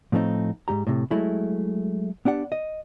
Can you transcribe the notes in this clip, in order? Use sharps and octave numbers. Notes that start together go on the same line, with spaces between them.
A2 F3 A3 C4 D#4
G#2 C3 G4 A#5
A2 C3
F#3 G#3 A3 E4
B3 D4 G4 F#5
D#5